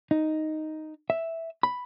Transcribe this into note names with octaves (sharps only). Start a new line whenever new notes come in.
D#4
E5
B5